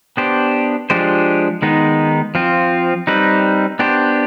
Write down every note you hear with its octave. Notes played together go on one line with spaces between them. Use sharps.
B3 D4 G4 C5
F3 G#3 D4 G4 C5
D#3 G#3 B3 D#4
F3 C4 F4
G3 C4 D#4 B4
B3 D4 G4 C5